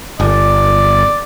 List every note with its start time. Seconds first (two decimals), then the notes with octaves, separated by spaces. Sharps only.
0.20 G1 D5